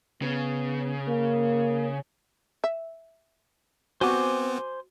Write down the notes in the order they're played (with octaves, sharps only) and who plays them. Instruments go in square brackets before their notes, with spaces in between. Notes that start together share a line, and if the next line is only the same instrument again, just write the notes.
[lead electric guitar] C#3 [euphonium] B3
[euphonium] A#3
[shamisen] E5
[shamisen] G3 [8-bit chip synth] B3 C4 [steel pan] F#4 [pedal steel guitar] C5 G#5 D6